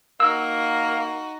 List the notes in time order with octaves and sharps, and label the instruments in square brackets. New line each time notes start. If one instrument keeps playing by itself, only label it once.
[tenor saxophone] A#3 [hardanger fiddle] D#4 F#4 [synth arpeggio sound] E6